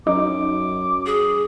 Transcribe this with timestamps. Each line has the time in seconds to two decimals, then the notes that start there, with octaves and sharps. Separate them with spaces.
0.07 F#2 D#4 D6
1.06 G#4